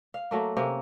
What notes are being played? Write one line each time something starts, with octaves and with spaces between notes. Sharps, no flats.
F5
F#3 A3 A#3
C3 A#3 C#4